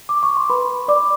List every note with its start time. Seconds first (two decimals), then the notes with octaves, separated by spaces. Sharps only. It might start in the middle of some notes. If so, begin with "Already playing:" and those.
0.09 D6
0.23 C#6
0.37 C6
0.50 B4 B5
0.88 D5 D6